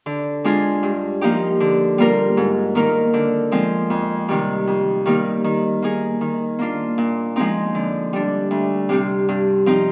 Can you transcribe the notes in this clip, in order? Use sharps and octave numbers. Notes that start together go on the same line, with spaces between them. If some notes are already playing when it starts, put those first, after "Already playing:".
D3
G#3 D4 F4 G#4
G2
F3 A#3 D#4 G4
D3
G3 A#3 F4 A#4
G#2
D#3 A#3 D#4 A#4
D3
F3 G#3 C4
F2
C3 D#3 G3
F2
D#3 G3 A#3 D#4
D#3
A#3 D#4 G#4
D#3
A#3 D4 F4
A#2
F3 G#3 C4 D#4
D3
G3 D4
D2
C3 G3 C4
G2
F3 C4 D#4